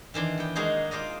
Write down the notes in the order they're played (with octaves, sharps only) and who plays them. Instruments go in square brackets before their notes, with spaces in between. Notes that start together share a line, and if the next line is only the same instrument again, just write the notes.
[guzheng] D#3 E3 D4 C6
B3 G5
G#3 A#3 D#4 F#4 G#4 C5
F4 C5 D5 D#5